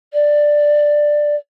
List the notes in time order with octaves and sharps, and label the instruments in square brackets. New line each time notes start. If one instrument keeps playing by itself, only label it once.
[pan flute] D5